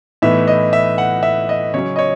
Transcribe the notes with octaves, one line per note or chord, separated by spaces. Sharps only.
A2 E3 B3 D#4 E5
D#5
E5
F#5
E5
D#5
C#3 F#3 C#4 C#5
D#5
C#5